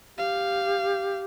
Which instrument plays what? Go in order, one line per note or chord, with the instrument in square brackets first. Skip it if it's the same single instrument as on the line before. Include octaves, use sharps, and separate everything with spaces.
[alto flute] G4 [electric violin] F5